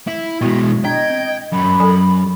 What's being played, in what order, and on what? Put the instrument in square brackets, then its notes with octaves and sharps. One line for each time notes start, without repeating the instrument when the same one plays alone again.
[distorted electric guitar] E4
[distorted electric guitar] B2 G#3 [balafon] B3 E4 F#4
[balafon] D4 [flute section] D#5 G#6 [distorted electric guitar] G5
[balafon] C4
[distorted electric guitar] F#2 [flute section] B5
[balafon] F#3 A4 G#5